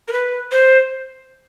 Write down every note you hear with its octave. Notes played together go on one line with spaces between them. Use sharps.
A#4
B4
C5